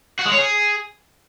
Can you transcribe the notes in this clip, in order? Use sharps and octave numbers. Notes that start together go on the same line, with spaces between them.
F#4
G#3
C#5
G#4